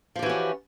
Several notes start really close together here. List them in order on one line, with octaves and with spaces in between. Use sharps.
F3 G4 E3 F#4 C#4